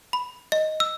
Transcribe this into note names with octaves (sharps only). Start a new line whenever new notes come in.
B5
D#5
E6